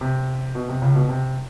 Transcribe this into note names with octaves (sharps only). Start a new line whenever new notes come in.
C3
B2
C3
C#2 C#3
B2
C3